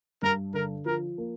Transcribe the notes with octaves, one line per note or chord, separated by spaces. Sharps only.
G2 A#4
D3 A#4
F3 A#4
A#3